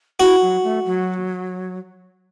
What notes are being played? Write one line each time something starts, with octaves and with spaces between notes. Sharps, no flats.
E4 F#4
F#3
A3
F#3